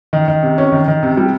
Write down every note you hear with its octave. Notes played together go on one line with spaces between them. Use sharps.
D#3
D#3
C3
C#4
D#3
D#3
C3
G3